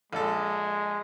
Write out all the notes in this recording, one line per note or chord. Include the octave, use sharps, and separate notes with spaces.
A#1 G#3 A4